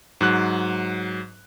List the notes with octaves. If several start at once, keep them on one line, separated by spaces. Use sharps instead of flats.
G#2 F#3 F#6